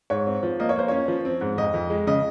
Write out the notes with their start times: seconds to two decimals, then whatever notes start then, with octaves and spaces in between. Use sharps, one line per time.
0.10 G#2 C#5
0.27 C4
0.43 F3
0.59 A#3 D#5
0.69 C#5
0.76 A#3 C5
0.88 C#4 C#5
1.08 F3
1.25 C4
1.41 G#2
1.58 F2 D#5
1.74 F2
1.90 G#3
2.07 C#3 D#5